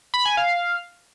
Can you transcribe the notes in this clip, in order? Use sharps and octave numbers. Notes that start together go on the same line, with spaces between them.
B5
G#5
F5